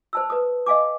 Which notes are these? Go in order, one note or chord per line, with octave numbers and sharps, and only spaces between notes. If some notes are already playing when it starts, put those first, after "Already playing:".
C5 A5 E6
B4 D#6
D#5 F5 G#5 D6